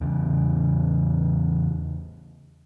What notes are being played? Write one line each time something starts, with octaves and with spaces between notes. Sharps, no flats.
E2 C#3